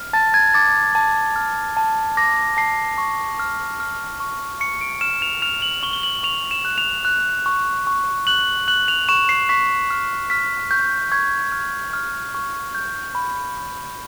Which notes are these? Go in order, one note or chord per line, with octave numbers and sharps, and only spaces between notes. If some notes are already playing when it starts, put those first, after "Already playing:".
Already playing: F6
A5 A6
G#6
D6 A6
A5
F6
A5
D6 A#6
A5 C7
C#6
F6
F6
C#6
C#6 C#7
D7
F6 E7
F7
F6 F7
F#7
C#6 G7
G7
F#7
C#6 F7
E7
F#6
F7
F#6
C#6
C#6
F#6 F#7
F#6 F#7
F7
C#6 E7
C7
C#6 B6
F6
F6 B6
C#6 G6
C#6 G#6
F6
F6
C#6
G6
B5